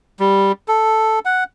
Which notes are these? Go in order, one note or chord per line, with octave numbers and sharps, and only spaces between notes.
G3
A4
F#5